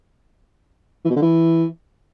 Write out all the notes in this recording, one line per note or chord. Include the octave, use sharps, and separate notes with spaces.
E3
B2
D3
E3